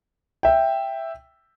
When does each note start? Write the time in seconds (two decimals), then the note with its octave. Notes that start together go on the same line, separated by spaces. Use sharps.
0.43 E5 G5